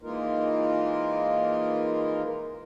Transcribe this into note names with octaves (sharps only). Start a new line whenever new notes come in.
E3 G#3 A#3 D#4 F4 A#4